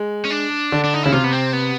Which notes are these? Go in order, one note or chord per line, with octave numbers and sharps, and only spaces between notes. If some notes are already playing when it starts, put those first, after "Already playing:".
Already playing: G#3
C#4
D4
D3
D4
D#4
C#3 E4
C3 F4
B3
C4
B3